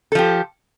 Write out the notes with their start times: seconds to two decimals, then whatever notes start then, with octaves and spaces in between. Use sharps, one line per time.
0.12 A4
0.15 F3
0.18 G4